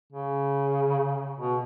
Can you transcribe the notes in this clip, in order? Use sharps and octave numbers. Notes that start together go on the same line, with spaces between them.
C#3
B2